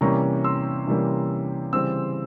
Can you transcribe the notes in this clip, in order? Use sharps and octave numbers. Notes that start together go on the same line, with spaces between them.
C3 E3 G3 A#3 C#4 A#5 C#6
C6 E6
C3 E3 G3 A#3 C#4
C#3 E3 G3 C4 C6 E6